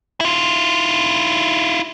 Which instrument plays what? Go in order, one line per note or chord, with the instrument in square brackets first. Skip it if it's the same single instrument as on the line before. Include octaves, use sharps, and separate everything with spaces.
[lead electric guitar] E4 F4